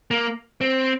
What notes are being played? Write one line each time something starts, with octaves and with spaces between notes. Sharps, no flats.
A#3
C4